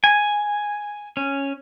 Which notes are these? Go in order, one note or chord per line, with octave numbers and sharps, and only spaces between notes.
G#5
C#4